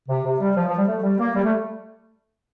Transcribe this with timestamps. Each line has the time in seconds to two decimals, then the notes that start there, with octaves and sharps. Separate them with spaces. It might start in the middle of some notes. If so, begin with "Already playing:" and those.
0.09 C3
0.25 C3
0.41 G3
0.56 F3
0.67 F3
0.78 G3
0.88 A3
1.04 G3
1.20 A#3
1.35 G3
1.45 A3